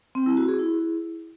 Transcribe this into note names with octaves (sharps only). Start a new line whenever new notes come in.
C4
E4
F#4
G#4
E4